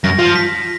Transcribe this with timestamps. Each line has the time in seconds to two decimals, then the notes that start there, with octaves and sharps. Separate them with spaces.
0.04 F#2 A#6
0.19 F3
0.36 B6